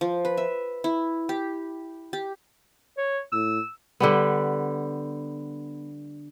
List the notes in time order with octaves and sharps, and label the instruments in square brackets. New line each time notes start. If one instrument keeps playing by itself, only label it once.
[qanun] F3
B4
E5
E4
G4
G4
[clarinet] C#5
[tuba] A2 [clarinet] E6
[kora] D3 G3 B3